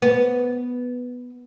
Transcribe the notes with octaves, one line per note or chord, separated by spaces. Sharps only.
B3